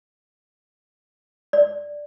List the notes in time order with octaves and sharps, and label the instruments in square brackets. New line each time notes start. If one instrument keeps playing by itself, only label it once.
[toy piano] D5